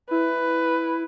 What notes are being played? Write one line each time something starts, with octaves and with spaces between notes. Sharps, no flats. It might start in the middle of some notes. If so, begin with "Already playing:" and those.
E4 B4